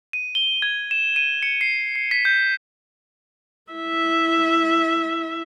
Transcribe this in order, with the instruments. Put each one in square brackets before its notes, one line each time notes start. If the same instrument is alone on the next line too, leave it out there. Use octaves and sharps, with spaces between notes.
[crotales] D#7
G7
G#6
E7
D#7
C#7
C7
C7
B6
G6
[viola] E4 E5